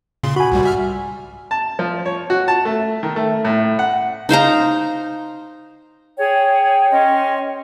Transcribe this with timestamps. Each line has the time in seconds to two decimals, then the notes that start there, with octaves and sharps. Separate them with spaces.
0.23 A#2 C#3 C6
0.36 F#4 G#5 B5
0.52 C2 G#2 G3
0.63 G3 E5 F6
1.51 A5
1.79 F3
2.06 C#5
2.30 F#4
2.48 A5
2.65 A3
3.03 D#3
3.16 A3
3.45 A2
3.79 F#5
4.29 D#4 C5 F5 A#5
6.19 G#4 C#5 G5
6.92 C#4 D#5 C6